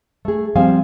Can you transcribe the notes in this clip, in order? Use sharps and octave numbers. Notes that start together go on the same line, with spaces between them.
A3 G#4
F3 G3 C4 F5 G#5